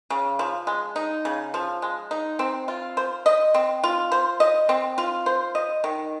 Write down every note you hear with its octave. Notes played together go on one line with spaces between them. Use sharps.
C#3
F3
G#3
D#4
C#3
F3
G#3
D#4
C4
F4
C5
D#5
C4
F4
C5
D#5
C4
F4
C5
D#5
D#3